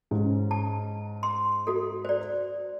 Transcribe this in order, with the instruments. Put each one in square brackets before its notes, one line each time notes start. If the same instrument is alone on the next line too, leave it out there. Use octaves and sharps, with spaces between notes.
[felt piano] G#2 C#4
[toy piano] A5
C6
F#4 A4
C5 D5